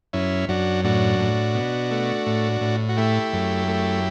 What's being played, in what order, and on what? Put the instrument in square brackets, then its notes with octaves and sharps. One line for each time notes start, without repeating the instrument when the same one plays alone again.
[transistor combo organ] F#2 C#4 E4
F#2 D4 F#4
A2 D4 F#4
A2
B2
A3
A2
A2
F#4
A3 E4 G4
F#2
A3